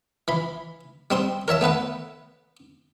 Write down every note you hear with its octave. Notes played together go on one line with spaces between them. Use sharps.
E3 B5
G3 C4 C6 D#6
A#4 C#5 E5 A5
A3 B3 B4 F#5